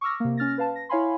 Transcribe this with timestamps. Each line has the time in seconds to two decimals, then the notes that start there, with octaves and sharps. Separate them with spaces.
0.01 C#6 D6 E6 F6 A#6
0.20 C3 A#3
0.37 C#4 F6 A6 A#6
0.58 B4 F5 A5
0.76 A#6
0.89 E4 C#5 F5 G#5 B5 C6